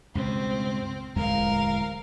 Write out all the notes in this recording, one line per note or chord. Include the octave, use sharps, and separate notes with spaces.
C#2 G2 B2 C4
D1 E2 G#3 A#4 F5